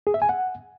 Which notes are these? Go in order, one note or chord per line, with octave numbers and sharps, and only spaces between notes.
G#4
E5
G#5
F#5